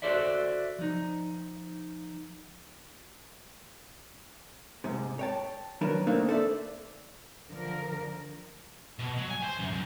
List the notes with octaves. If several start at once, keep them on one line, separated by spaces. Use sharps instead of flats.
F#4 A4 C5 D5 E5
F3 D#4
G#2 C3
C#5 G5 A5
D#3 F#3 D4 A#4 B4
A3 A#3 C4 D4 D#4
A4 C5 D5 E5
D3 F3 A#4
B2
F#3
G#5
C5
F#2
C#2